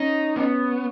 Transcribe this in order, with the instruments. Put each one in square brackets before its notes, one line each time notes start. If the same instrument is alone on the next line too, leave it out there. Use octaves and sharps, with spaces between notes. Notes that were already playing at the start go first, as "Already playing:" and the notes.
Already playing: [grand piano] C#4 [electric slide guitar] D#4
[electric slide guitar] B3 [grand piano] C#4